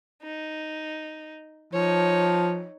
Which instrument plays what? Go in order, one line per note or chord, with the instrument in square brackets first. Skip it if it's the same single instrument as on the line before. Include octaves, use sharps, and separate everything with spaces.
[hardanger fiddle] D#4
[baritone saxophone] F3 [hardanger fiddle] D#4 C#5